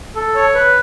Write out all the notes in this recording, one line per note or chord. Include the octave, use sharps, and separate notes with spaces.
A4
C#5
B4